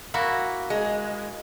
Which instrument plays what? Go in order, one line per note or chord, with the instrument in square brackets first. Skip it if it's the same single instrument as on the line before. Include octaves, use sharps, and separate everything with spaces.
[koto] A#3 E4 F#4
[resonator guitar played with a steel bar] G#3